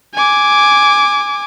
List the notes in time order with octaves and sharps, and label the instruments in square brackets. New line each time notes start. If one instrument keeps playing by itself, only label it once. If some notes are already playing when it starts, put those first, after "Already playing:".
[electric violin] G#5 D6